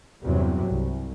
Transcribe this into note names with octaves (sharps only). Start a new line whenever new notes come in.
E2 G2 C3 F#3
C2